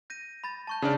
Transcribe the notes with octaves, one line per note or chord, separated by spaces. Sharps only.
G6 A#6 D#7
B5 A6
A5 C#6 G6
C#3 D4 D5 F6